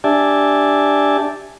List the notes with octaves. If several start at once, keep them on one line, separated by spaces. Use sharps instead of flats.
D4 G4 D5 E5 G#5 A5